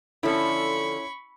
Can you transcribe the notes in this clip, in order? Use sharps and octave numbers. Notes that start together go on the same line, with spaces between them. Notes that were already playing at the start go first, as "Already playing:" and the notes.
D3 F3 C#4 E4 A4 B5 C#6